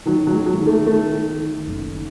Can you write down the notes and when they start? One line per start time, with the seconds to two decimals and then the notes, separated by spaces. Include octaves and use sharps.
0.06 D#3 F#3
0.27 F#3
0.33 G#3
0.46 F#3
0.59 D#3
0.67 A3
0.87 D#3 A3
1.13 D#3
1.41 D#3
1.67 F#1
1.94 D#3